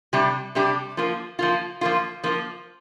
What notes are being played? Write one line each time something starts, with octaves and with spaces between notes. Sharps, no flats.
C3 G3 D4 G4
C3 G3 D4 G4
F3 A#3 F4
F3 A#3 F4
F3 A#3 F4
F3 A#3 F4